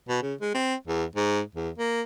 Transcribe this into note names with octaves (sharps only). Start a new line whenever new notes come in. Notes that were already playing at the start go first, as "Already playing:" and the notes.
B2
C#3
G#3
C4
E2
G#2
E2
A#3